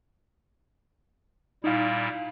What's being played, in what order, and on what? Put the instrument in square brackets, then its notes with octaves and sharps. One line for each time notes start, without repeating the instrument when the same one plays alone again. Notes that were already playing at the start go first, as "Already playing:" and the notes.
[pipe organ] A#2 G3 E4 [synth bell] D#4 F5